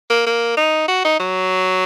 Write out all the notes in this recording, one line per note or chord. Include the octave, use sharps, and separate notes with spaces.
A#3
A#3
D#4
F#4
D#4
F#3